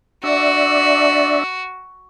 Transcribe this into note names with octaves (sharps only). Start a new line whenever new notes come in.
D4 F#4 D5 E5